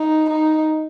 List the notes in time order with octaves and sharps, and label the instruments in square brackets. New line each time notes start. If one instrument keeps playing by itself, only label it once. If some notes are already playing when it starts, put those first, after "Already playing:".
Already playing: [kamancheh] D#4
D#4